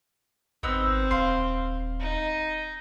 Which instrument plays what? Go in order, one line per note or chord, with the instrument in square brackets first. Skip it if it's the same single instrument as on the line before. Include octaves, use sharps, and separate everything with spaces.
[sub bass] G#1 [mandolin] B3 D#4 E6 [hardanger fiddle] C4
[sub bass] D#1 [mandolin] F5 C6
[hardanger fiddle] D#4